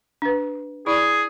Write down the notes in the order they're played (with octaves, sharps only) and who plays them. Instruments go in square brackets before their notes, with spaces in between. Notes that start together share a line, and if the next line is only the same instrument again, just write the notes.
[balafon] D4 B4
[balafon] E4 D5 B5 [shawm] G#4